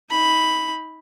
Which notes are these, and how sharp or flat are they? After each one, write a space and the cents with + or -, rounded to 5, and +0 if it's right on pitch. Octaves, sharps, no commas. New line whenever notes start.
D#4 +30 B5 +0